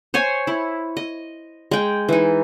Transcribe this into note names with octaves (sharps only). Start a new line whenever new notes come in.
C5 C#5 G#5
E4
D#5
G#3 G5
E3 D#4